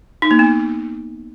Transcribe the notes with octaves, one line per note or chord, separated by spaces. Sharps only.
D#4
A#3
B3